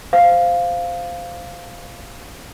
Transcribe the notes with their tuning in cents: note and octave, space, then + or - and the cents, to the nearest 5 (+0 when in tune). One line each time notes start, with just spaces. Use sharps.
C5 -15 F5 +0